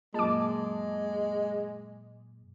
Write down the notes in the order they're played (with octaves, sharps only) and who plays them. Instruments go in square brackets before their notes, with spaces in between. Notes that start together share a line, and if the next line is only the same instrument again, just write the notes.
[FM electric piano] F#2 A#2 [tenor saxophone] G#3 [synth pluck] A5 D6